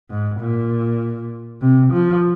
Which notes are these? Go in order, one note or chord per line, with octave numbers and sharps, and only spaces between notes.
G#2
A#2
C3
F3